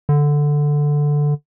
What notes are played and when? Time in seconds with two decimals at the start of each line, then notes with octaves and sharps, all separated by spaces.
0.09 D3